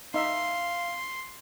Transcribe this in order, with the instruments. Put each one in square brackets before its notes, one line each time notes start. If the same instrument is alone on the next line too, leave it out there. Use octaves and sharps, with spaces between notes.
[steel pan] D#4 E5 [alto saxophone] F5 [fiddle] C6